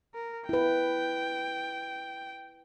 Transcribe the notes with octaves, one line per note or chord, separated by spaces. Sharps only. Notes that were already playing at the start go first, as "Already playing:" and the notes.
A#4
E4 B4 G5